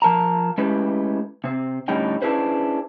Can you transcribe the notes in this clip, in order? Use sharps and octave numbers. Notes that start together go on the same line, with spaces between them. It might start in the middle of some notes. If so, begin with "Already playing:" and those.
F3 A#4 A5 A#5
G#3 A3 C#4 E4 G4 B4
C3 C4
A2 D3 G3 C#4 D#4 G5
C#4 D4 E4 G#4 B4 C5